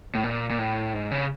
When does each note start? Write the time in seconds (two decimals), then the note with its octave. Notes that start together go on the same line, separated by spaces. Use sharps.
0.15 A2
0.24 A#2
0.50 A#2
0.59 A2
0.94 G#2
1.11 C#3